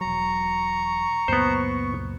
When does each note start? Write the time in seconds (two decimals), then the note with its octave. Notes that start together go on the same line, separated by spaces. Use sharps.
0.01 E1 F#3 A#5 C#6
1.28 C#2 F#2 A#2 B3 C5